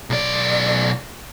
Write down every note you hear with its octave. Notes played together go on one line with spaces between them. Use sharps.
B1 D5